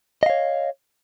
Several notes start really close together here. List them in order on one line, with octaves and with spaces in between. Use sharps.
D#5 F5 C#5